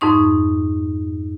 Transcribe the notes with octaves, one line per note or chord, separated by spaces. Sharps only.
F2 G#2 D#4 C#6